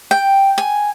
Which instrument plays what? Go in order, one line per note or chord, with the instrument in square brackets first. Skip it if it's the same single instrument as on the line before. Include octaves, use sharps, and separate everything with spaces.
[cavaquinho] G5
G#5